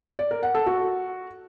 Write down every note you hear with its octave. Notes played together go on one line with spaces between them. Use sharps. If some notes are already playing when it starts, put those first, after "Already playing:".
D5
A#4
F#5
A4
F#4